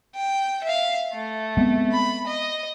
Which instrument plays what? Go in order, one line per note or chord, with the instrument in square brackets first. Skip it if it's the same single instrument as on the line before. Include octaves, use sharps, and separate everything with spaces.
[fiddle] G5
E5 F5
A3
[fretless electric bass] G#3 B3 C4
[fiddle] B5
D#5